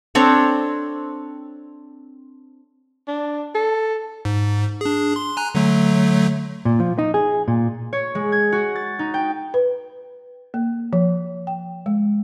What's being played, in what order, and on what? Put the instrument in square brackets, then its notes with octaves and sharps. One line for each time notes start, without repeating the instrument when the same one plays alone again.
[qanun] C4 D4 A4 C#5
[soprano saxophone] D4
A4
[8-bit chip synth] G#2
D4 G#4
C6
G#5 A#5 F#6
D3 F#3 A3
[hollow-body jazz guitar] A#2
F3
D#4
G#4
A#2
[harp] C#5
G#3
G#6
F#4
A6
D#4
G5
[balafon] B4
A#3
F3
G5
G#3